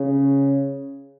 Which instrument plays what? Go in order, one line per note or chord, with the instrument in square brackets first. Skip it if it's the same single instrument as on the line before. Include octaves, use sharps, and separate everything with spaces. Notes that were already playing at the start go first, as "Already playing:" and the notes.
Already playing: [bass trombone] C#3